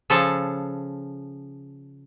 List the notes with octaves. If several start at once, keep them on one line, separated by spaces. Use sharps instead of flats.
C#3 F3 G#4 A4